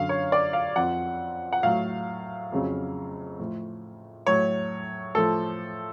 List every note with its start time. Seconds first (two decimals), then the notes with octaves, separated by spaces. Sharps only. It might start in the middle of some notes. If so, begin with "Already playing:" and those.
Already playing: F#2 D3 F#3 F5
0.09 C#5
0.32 D5
0.53 F5
0.76 F2 F3 F#5
1.53 F#5
1.63 A2 F#3 F5
2.52 F2 C#3 F#3
3.39 A2 F3
4.27 A2 F#3 C#5
5.15 A2 F3 A4